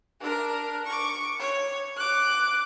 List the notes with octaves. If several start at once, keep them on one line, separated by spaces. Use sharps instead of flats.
D4 A#4
C#6 D6
C#5
D6 F#6